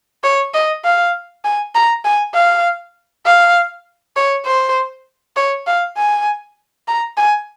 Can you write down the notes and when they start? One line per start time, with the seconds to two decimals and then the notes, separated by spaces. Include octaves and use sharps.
0.24 C#5
0.54 D#5
0.84 F5
1.44 G#5
1.75 A#5
2.05 G#5
2.34 F5
3.26 F5
4.16 C#5
4.46 C5
5.37 C#5
5.67 F5
5.97 G#5
6.88 A#5
7.17 G#5